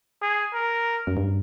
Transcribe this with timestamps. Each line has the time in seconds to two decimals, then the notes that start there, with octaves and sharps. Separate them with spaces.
0.21 G#4
0.53 A#4
1.07 F#2
1.17 G2